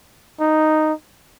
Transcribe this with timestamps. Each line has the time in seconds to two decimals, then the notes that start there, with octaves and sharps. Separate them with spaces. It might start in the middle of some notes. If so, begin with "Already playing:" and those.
0.41 D#4